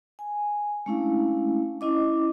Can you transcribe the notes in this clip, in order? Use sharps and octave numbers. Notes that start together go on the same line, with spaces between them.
G#5
G#3 A3 C#4 D4 E4 F5
C#4 E4 D#5 D6